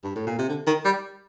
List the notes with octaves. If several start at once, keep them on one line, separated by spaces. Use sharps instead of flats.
G2
A2
A#2
C3
D3
D#3
G3